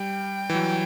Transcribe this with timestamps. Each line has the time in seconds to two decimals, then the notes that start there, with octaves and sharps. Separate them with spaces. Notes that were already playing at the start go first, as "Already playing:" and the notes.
Already playing: G3 G5
0.50 E3
0.55 F#3